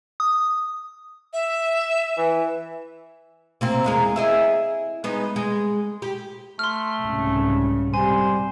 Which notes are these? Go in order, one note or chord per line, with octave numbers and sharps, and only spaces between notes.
D#6
E5
E3
C3 A#3 C4
E2 G#3 A#4
E4 G#4 D#5
G#3 B3 D#4
G#3
G4
A3 C6 F6
C2 G#2 C#3
C3 G3 C5 G#5